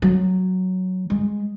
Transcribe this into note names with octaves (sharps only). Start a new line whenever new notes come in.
F#3
G#3